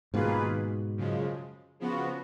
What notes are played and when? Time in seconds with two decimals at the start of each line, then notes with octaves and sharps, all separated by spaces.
0.14 G#2 B2 D#3 A#3 F4 G#4 B4
0.97 F#2 C#3 F3 G#3
1.80 C#3 F3 B3 F#4